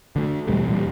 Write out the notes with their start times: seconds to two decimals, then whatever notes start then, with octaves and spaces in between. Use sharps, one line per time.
0.16 D3 A3
0.47 E2 B2 G3 A3
0.67 E2 A#2 G3